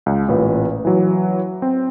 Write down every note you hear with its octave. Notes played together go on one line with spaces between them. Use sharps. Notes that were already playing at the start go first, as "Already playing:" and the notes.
C#2
A1 A#2 B4
E3 F#3
C4